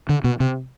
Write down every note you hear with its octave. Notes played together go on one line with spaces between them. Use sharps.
D3
B2
C3